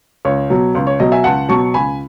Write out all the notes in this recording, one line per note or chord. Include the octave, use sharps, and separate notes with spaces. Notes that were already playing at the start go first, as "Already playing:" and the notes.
C#2 C#5
B2 F#3
C#2
C#5
B2 F#3 D#5
E5 G#5
C#2 F#5 A5
B2 F#3 A5 C#6
C#2 G#5 B5